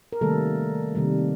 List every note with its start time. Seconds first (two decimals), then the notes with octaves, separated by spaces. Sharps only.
0.13 A#4
0.21 C3 D#3 G3 A3 A#3 A4
0.95 C3 D#3 G3 A#3